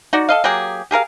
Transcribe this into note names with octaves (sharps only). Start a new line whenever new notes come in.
D#4 F#4 D5
A4 D#5 F5
F#3 A#3 G4 G#4
G4 G#4 A#4 F5